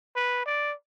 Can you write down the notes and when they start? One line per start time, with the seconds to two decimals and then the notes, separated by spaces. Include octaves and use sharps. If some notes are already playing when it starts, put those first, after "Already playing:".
0.16 B4
0.46 D5